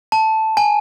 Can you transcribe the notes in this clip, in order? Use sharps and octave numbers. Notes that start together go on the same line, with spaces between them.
A5
G#5